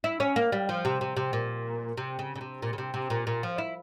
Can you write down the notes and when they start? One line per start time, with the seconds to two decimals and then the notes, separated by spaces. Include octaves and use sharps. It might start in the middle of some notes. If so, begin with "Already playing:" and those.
0.04 E4
0.20 C#4
0.36 A#3
0.52 G3
0.69 F3
0.85 C3
1.01 C3
1.16 C3
1.33 A#2
1.97 C3
2.19 C#3
2.35 C#3
2.41 C3
2.62 A#2
2.73 C#3
2.78 C3
2.94 C3
3.10 A#2
3.27 A#2
3.43 F3
3.58 E4